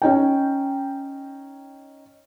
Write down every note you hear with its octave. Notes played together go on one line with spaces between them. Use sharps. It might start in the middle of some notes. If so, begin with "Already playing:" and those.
C#4 D#4 G5